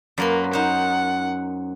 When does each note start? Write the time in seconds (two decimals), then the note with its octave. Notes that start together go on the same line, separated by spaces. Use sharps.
0.18 F#2 A#3 B4 C6
0.53 D#4 C5 F#5